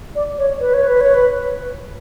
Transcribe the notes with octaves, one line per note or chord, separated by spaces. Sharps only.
D5
C#5
B4
C#5
B4
C#5
B4